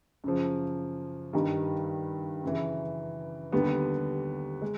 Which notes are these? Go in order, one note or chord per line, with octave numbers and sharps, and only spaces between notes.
F#2 C#3 F3
G2 D#3 G3
F#2 C#3 E3
D#2 D3 G3 B3
G#3